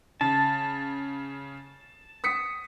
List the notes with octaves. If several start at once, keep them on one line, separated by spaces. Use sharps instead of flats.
C#3 A5
D#6 B6 C#7